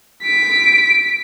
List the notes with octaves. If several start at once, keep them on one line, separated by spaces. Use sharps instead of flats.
B6 D7